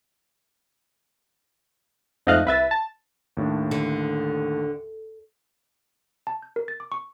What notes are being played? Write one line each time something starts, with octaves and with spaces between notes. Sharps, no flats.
F2 G#2 A3 D#5 F5 F#6
C2 B4 E5 A6
A5
D#2 A2 D4
D3
A5
G6
A#4
A6
D6
C#6